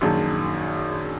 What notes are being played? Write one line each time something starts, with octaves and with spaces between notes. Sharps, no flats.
A#1 F#2 D#3 G#4 A5